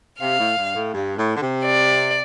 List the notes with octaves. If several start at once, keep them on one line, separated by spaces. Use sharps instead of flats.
C3 F5
A2
G2
A2
G2
A2
D3
C3
D5